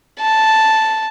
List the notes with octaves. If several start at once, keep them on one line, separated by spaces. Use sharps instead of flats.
A5